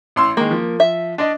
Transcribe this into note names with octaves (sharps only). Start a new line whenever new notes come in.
A1 C6 E6
D#3 G#3 A#3
F3
E5
D4 D5 D#5